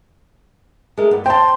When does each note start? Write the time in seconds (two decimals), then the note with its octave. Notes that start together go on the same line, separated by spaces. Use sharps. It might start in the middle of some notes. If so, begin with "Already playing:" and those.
0.98 G#3 A3 A#4
1.11 G2 B3
1.26 C4 G5 A5 C6